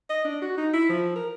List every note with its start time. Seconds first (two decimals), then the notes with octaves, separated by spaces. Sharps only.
0.10 D#5
0.25 D4
0.42 F#4
0.58 D#4
0.73 E4
0.89 F3
1.16 A#4